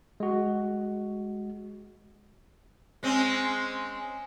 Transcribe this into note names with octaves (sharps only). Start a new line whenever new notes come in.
G#3 F#4
G#3 C4 C#4